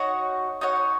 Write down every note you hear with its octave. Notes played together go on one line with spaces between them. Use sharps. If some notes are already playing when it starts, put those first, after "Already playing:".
Already playing: D#4 F#4 C#5 F#5
D#4 F#4 C#5 F#5